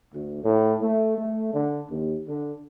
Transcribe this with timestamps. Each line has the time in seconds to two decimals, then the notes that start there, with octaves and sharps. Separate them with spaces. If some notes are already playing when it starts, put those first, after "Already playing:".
0.15 D2
0.44 A2
0.82 A3
1.18 A3
1.54 D3
1.91 D#2
2.28 D3